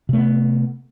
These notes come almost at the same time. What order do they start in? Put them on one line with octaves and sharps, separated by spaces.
C3 A3 B3